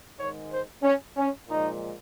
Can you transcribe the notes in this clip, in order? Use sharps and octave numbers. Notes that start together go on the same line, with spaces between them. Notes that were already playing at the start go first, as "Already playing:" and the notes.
G#2 D#3 G#3 C#5
C5
C#4
C#4
A#2 F3 G#3 D#4